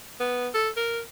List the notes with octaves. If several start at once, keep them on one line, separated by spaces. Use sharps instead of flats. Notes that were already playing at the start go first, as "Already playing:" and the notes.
B3
A4
A#4